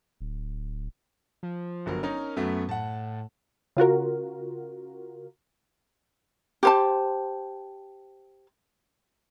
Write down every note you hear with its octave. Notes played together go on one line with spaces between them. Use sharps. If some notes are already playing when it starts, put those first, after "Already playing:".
D1
F3
G1 F#3 A#4
C#4 D#4 A#4
F#2 F#3 A3 B3
A2 F#5 A5
C#3 F4 F#4 A#4
G4 C5 A5